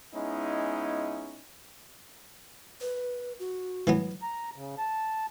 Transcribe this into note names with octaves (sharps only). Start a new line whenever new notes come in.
G#3 B3 C#4 D#4 E4
B4
F#4
E3 F#3 B3
A#5
C#3
A5